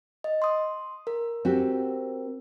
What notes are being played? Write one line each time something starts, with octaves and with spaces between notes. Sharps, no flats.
D#5
C6 D#6
A#4
C4 F#4 G4